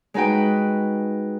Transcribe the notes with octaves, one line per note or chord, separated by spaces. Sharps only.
G#3 D#4 F#4 B4 G5